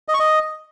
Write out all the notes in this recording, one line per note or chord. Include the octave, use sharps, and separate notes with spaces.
D#5
C#6
D#5